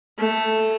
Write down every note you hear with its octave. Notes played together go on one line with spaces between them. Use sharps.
A3